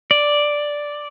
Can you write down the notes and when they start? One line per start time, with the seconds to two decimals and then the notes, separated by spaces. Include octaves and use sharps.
0.11 D5